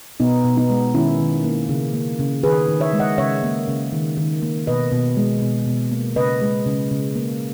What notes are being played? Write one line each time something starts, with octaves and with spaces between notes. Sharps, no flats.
B2 B3 D#4
B2
B3 D#4
G#3
D#3 C#4 E4
D#3
A#3
C#3
A#3
C#3
D#3 G#4 B4
D#3
C#5 E5
G#3
D#5 F#5
C#3 C#5 E5
A#3
C#3
D#3
D#3
A#3
B2 B4 D#5
B2
G#3
B2
B2
A#3
C#3 B4 D#5
G#3
C#3
C#3
A#3